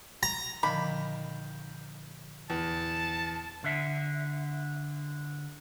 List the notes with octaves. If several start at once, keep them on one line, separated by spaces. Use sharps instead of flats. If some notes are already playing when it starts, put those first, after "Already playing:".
A#5
A#2 D3 D#3 F3 B5
E2 A5
D3 E5